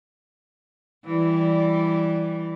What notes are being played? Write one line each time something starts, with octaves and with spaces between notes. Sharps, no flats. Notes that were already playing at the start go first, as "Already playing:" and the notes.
E3 G3 D5